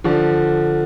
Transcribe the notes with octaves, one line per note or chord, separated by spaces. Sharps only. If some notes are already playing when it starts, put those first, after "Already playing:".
D3 F3